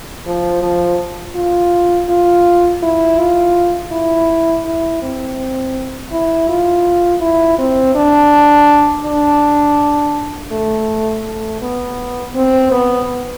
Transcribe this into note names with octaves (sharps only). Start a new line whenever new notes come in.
F3
F3
F4
F4
E4
F4
E4
E4
C4
E4
F4
E4
C4
D4
D4
A3
A3
B3
C4
B3